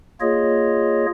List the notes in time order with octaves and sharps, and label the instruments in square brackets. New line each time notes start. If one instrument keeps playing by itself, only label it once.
[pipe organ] A#3 F4 G#4 C#5 D#5